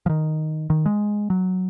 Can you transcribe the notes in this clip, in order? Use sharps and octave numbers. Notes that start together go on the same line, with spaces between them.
F3
D#3
D#3
G#3
F#3